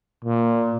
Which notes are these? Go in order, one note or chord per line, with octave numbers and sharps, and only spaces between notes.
A#2